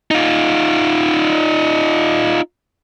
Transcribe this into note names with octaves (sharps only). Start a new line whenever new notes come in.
D#4 F4